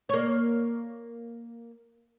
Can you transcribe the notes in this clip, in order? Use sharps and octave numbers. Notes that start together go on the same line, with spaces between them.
A#3 C#5